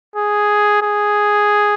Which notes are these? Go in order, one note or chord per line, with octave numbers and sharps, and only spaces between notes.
G#4
G#4